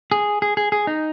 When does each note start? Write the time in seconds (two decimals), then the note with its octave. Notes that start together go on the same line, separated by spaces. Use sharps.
0.12 G#4
0.42 G#4
0.57 G#4
0.72 G#4
0.87 D#4